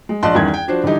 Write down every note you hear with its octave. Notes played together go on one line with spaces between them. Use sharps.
G#3
A#1 D5 D#5 A5 C6 F#6
E2 G2 D#3 E3 C#4 G#6
G5
F3 D4 F#4 C5
D3 E3 G3 D#4 G4